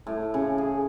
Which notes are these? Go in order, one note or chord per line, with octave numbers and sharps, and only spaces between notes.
A2
C#3
G#4